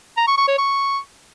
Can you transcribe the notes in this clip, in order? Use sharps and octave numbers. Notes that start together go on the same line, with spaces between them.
A#5
C#6
C#6
C#5
C#6